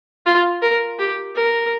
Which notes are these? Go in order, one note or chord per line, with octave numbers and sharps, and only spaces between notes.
F4
A#4
G4
A#4